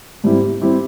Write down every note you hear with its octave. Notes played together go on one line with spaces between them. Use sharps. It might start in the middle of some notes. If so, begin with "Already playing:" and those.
G#2 G3 C4 E4 G4
G3 C4 E4 G4